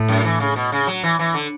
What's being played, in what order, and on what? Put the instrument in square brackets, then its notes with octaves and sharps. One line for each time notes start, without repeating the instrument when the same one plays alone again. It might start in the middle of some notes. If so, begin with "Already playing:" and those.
Already playing: [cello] A2
[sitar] F#2
E3
C#3
B2
C#3
F#3
E3
E3
D3